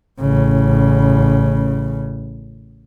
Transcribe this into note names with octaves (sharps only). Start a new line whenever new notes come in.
A1 C#3